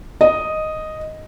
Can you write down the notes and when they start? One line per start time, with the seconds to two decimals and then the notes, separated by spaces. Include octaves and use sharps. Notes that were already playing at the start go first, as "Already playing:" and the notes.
0.21 D#5